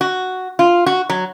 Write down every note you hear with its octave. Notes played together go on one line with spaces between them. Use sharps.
F#4
F4
F#4
F#3